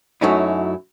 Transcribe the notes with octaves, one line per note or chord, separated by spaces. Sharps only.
F#2 F#3 A3 C#4 D#4 E4